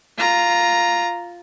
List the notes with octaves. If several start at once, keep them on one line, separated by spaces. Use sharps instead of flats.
F4 A#5